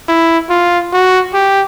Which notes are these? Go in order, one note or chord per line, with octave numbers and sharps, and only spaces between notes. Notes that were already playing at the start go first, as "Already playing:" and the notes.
E4
F4
F#4
G4